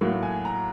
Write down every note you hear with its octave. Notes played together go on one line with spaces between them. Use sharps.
A2 F#3 A#3
G#5
A#5